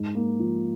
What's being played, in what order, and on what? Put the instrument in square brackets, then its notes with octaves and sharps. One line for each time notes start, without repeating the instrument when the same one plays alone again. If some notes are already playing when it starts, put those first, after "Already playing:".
Already playing: [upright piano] G#2
A#3
F3